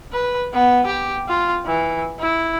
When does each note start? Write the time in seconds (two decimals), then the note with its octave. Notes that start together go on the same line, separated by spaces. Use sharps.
0.13 B4
0.53 B3
0.86 G4
1.28 F4
1.66 E3
2.20 E4